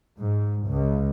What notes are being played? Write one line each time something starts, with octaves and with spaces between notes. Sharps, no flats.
G#2
C#2